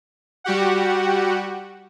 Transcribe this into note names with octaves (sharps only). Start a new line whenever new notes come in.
G3 F#4 G4 F#5